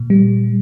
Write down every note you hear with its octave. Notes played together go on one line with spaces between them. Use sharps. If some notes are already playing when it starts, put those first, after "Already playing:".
Already playing: A#2
G3